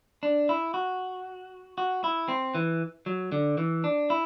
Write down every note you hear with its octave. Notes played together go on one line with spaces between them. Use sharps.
D4
E4
F#4
F#4
E4
C4
E3
F#3
D3
E3
D4
E4